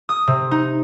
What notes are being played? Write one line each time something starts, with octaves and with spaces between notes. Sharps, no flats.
D#6
C3
D#4